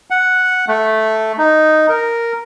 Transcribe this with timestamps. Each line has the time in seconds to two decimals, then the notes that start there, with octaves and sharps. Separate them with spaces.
0.10 F#5
0.68 A3
1.38 D#4
1.89 A#4